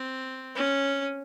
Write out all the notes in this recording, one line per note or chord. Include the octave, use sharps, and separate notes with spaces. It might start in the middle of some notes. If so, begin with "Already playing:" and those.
Already playing: C4
C#4